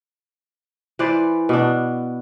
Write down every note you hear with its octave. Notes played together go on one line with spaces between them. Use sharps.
E3 B4 C5 D5
B2 D4